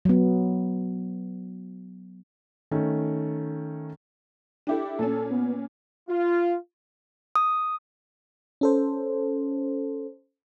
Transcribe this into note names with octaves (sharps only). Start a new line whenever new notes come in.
F#3 B3
D#3 A3 C#4
D4 E4 G4 A4
A#2 C#4 A4
B3
F4
D#6
C#4 A4 C5